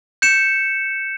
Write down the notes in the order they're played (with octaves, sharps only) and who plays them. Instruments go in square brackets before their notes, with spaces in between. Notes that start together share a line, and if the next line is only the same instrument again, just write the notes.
[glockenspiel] G6 C#7 E7